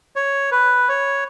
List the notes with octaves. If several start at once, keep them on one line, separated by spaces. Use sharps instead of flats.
C#5
B4
C#5